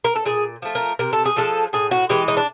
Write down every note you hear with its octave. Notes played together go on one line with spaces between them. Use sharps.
A#4
A4
A#2 G#4
F3 A3
A#4
C3 A#4
A4
G#4
F3 G#3 A4
A2 G#4
F#4
E3 G#3 G4
D#4
D4